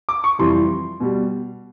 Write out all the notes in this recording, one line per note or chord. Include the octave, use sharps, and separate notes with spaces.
D6
C#6
F2 C3 E3 G3 C6
B2 G3